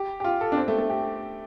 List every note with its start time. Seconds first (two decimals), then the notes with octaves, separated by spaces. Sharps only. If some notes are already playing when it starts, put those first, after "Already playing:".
Already playing: G4
0.20 G4
0.24 F4
0.41 A4
0.52 D4
0.57 C4
0.68 A3
0.78 A3
0.90 G4